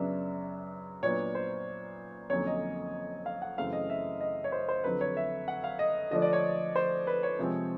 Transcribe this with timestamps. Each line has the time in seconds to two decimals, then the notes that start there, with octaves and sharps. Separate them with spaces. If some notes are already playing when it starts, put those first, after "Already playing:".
Already playing: F#2 C#3 F#3 B3 D4 E5
1.03 A#2 F#3 B3 D4 C#5
1.35 C5
2.30 F2 D3 F#3 A#3 C#4 C#5
2.47 D#5
3.26 F5
3.42 F#5
3.58 F#2 C#3 E3 A3 C4 F5
3.73 D#5
3.90 E5
4.21 D#5
4.44 C#5
4.52 C5
4.68 C5
4.84 F2 D3 F#3 B4
5.01 C#5
5.17 E5
5.48 F#5
5.64 F5
5.79 D#5
6.11 D3 F3 A3 D4 D#5
6.22 D5
6.33 C#5
6.76 C5
7.07 B4
7.23 C#5
7.39 C3 F3 G#3 C4